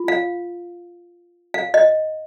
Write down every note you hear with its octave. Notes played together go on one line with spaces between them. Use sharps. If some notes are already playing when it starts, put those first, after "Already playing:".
Already playing: F4
F5
F5
D#5